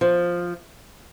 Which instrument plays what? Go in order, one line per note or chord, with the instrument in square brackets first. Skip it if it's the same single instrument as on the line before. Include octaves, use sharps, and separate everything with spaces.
[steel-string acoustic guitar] F3